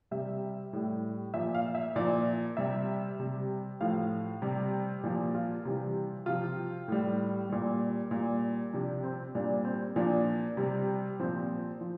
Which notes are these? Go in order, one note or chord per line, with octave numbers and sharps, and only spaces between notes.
C3 G3 E5
A2 G3
A#2 F3 E5
F5
E5
A#2 F3 D5
C3 G3 E5
C3 G3
A2 F3 F5
C3 G3
A#2 F3
F4
C3 E3 G3
C3 F3 F4
A2 G3
A#2 G3
A#2 G3
C3 F3 D4
C4
A#2 G3 D4
C4
A#2 F3 D4
C3 G3
A#2 F3 C4
F3